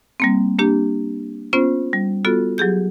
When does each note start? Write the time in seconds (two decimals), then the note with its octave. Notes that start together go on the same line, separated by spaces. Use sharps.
0.20 G3 A#3 C4
0.59 A#3 D4 G4
1.53 B3 C#4 F4 C5
1.93 G3
2.25 B3 F4 F#4 A4
2.58 F#3 G4 G#4 G6